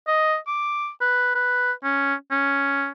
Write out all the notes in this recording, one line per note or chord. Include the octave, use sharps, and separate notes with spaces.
D#5
D6
B4
B4
C#4
C#4